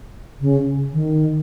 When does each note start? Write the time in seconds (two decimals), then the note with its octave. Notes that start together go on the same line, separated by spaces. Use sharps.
0.40 C#3
0.93 D#3